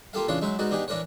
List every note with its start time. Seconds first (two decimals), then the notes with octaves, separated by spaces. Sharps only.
0.13 A#3 F4 G4 A4 F5
0.28 C#3 E3 D4 F4 C#5 C6
0.41 F#3 G#3 D#4 E5
0.59 G#2 B3 D#4 F#4 D5
0.71 B3 D4 D#4 G4 G#4
0.88 E3 D4 A#4 B4 C#5